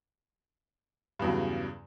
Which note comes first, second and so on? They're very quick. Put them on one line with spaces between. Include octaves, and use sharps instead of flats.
G2 E2 F#3 C#3